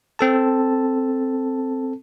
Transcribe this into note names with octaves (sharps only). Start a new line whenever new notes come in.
C4 A4 A5